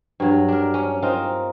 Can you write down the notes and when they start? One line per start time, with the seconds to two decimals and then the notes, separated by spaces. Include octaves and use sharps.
0.20 G2 F#3
0.48 D4 A#4
0.74 C#4
1.02 C4 D#4 F4 A#4